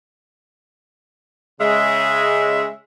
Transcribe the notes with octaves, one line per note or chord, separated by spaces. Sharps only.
C#3 G#3 E5